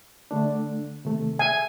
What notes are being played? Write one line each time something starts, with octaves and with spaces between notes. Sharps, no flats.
D3 A3 D4
C3 D#3 A3
E5 G#5